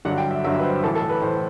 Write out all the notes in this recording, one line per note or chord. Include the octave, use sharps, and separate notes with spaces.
G2 D3 F#3 F#5
G5
E5
G2 D3 F#3 E5
B4
C5
A2 E3 A4
A4
B4
A2 E3 C5